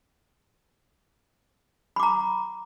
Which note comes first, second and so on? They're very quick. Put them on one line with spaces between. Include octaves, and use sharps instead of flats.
B5 D6 A#5